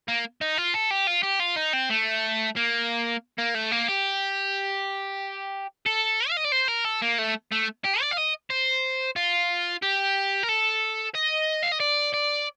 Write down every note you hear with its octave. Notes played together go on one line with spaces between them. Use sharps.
A#3
D#4
F4
A4
G4
F4
G4
F4
D#4
C4
A3
A#3
A#3
A3
A#3
G4
A4
F5
D#5
D5
C5
A#4
A4
A#3
A3
A3
G4
D5
F5
D#5
C5
F4
G4
A#4
A4
D#5
F5
D#5
D5
D5